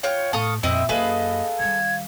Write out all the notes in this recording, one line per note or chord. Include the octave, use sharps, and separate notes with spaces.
F4 C#5 G5
A2 A4 F5 C#6 D#6
F2 A#2 C4 E4 D#5 E6
F#2 A#3 G#4 A4 B4 D#5 F5
D#3 G3 G#6